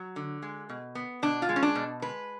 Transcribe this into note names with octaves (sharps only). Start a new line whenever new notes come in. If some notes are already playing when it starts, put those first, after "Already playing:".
Already playing: F#3
D3
G#3
B2
B3
B2 D4
F4
G#3
C#4
D4
B2
G#3 B4